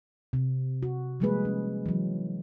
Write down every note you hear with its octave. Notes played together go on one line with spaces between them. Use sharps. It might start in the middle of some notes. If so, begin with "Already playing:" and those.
C3
F#4
F3 G3 G#3 A#3 G#4 B4
C#4
E3 F#3